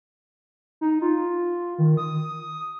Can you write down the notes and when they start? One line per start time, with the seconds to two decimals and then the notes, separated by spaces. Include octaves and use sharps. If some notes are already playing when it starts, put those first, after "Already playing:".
0.81 D#4
1.02 F4
1.78 D#3
1.97 D#6